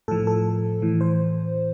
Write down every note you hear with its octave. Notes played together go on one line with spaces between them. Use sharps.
A2 F3 A4
A4
A2 E3
C5